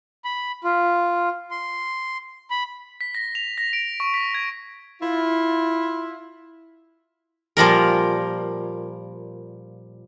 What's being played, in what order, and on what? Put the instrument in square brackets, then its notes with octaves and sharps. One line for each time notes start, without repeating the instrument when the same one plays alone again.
[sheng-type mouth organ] B5
F4
C6
B5
[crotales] B6
A#6
F7
A#6
D7
C#6
B6
G#6
[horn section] E4 F4
[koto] A#2 F3 G3 A#4